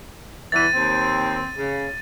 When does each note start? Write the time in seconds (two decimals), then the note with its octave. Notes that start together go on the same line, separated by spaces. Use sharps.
0.52 E2 E3 A6 D#7
0.73 D#2 C4
1.55 C#3